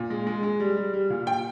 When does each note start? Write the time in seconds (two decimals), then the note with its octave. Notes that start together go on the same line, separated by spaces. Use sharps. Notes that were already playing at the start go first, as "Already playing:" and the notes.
Already playing: A#2
0.10 G#3
0.27 G#3
0.43 G#3
0.60 G3
0.76 G3
0.93 G3
1.10 A#2
1.27 G5